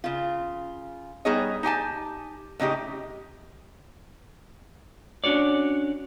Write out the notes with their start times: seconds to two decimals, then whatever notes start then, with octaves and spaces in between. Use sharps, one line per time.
0.04 C#3 F4
1.25 G3 B3 D#4 G#4 C#5 D#5
1.63 D#4 G4 G#5 A5
2.60 A2 C#3 D#4 G4
5.24 C#4 D4 F#4 C#5 D5